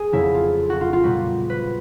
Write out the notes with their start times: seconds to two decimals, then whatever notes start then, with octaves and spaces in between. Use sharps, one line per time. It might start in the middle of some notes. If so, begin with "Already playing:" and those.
Already playing: G#4
0.12 F2 C#3 F#3 A#3 E4
0.35 F4
0.70 F#4
0.81 F4
0.93 F4
1.03 A#2 G3 B3 F#4
1.50 B4